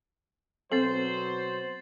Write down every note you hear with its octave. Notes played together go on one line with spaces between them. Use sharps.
B2 F#3 C4 A4 C5 A6 C7 F#7